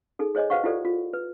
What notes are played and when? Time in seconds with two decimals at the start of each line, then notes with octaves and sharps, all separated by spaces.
0.19 D#4 G#4 A4
0.35 G#4 C5 C#5 D#5 G#5 D6
0.50 F#4 B4 C5 F5 F#5 C#6
0.64 E4 F4 G4 A4 C5 D5
0.85 F4
1.13 B4